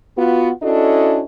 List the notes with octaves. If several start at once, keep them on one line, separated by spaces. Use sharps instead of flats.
B3 F4 F#4
C#4 D4 E4 F#4 A4 D#5